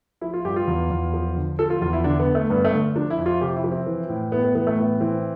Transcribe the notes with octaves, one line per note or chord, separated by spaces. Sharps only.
F3 E4
F4
G2 G4
F4
E2
E2
F3
D3
F3 A4
F4
E2 F4
E4
D3 D4
B3
D3
A3
G2 B3
A3
D3
F3 D4
E4
F2
F4
C3 G4
E4
F3
C4
E3
A2
A2 B3
B3
E3 B3
A3
A2 B3
E3 C4